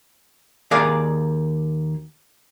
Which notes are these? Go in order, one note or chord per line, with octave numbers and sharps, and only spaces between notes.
D#2 G#4 A#4 D5 F5